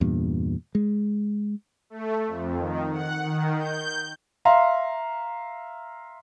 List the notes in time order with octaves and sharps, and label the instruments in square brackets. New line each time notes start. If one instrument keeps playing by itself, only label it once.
[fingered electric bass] E2 G2 A#2
G#3
[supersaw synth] A3
F2
D#3
F#5
D#3
G6
[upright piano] E5 F5 A#5 C6